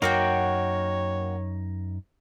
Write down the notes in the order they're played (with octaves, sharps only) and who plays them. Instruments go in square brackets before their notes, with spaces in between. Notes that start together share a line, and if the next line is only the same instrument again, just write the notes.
[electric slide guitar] F#2 D#4 [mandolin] A#3 F#4 G5 [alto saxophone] C#5